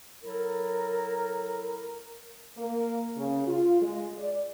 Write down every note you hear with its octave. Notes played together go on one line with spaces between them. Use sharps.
F#3 E4 A4 A#4
A#3
C#3
F4
G#3
D5